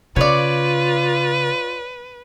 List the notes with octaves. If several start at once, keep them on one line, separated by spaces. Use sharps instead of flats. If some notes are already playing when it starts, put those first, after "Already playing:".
C#3 F4 B4 C#5 D5